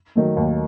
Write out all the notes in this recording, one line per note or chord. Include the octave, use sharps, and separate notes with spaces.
D#3 F#3 A3
D#2